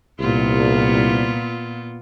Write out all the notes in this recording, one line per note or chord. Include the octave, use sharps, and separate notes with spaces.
C2 A#2 B3 F4